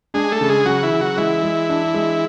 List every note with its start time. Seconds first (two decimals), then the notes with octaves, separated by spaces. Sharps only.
0.14 G#3 D4 G#4
0.31 A3 A4
0.41 C#3
0.49 G#3 G#4
0.65 C#3 F#3 F#4
0.83 E3 E4
0.92 C#3
1.01 F#3 F#4
1.17 E3 G#3 E4
1.43 G#3
1.69 D4
1.94 G#3